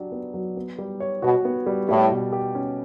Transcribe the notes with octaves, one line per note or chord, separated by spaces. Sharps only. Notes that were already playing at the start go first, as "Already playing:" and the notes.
Already playing: F#3 D4 G4
B3
F#3
B3
G3
C#5
B2 F#4
B3
G3
A2 G3
B2
G4
C#4